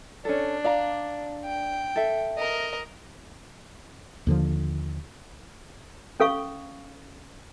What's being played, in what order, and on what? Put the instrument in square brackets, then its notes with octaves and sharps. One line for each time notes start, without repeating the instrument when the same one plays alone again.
[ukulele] C#4 A4 [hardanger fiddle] D4
[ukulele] D5 F5 A#5
[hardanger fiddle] G5
[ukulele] A4 E5
[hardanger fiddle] A#4 D#5
[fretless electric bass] D#2 D3 F3
[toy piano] C#4 A4 F5 C#6